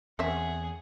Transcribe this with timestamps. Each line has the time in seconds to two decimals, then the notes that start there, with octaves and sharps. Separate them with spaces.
0.19 E2 C4 C#4 G#4 E5 F#5